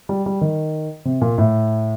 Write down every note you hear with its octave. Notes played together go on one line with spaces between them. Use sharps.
G3
G3
D#3
C3
A#2
A2